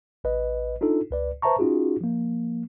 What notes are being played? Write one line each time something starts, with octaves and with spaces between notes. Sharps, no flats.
A1 B4 D#5
D4 D#4 F4 A4
C#2 B4 D5
B4 C5 E5 A5 A#5 C#6
C#4 D#4 F4 F#4 G#4
F3 A#3